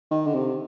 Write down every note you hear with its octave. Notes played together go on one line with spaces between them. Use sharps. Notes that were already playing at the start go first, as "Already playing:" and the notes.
D#3
D3
C3